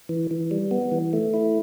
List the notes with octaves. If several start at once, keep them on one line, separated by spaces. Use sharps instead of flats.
E3
E3
G3
B3
E3
A3
E4